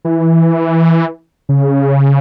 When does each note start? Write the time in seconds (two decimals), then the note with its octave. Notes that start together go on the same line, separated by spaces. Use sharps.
0.05 E3
1.49 C#3